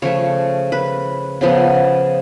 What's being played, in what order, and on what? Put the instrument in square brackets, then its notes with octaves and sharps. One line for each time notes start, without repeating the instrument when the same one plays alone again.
[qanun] C#3 F3 A3 C#5
B4
C#3 F3 B3